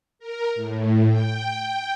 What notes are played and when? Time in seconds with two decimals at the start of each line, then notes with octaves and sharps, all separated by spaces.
0.19 A#4
0.55 A2
1.09 G5